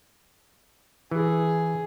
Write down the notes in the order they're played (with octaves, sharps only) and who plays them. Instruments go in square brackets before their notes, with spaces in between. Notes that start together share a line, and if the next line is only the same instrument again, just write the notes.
[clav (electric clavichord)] E3 [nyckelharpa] G#4